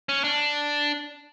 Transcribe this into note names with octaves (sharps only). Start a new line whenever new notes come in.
C#4
D4